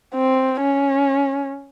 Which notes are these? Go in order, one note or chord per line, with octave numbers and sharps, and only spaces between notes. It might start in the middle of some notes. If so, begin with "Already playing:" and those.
C4
C#4